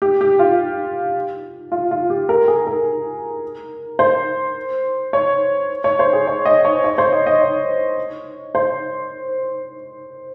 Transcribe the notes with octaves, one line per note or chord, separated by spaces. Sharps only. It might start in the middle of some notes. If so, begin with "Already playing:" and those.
G4
G4
F4
F4
F4
G4
A#4
G#4
A#4
C5
C#5
C#5
C5
G#4
C#5
D#5
C#5
C#5
C5
D#5
D#5
C#5
C5